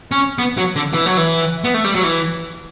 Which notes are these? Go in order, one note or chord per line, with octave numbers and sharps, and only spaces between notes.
C#4
B3
F#3
D3
E3
F#3
E3
B3
A3
G3
F#3
E3